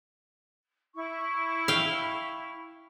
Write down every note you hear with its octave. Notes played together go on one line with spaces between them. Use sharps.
E4 C#6
F5 G5